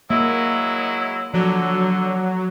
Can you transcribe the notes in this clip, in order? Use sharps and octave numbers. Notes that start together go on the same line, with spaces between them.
F#3 G#3 A#3 E4
D3 F3 F#3